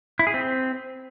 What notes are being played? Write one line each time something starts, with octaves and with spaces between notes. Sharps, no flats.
E4
G#4
C4